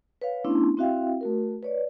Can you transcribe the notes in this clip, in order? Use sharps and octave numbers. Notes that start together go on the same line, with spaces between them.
B4 C#5 F5
A3 B3 C#4 D4 E4 C6
C4 E4 F#4 E5 F5 G5
A3 F#4 A#4
B4 C#5 D5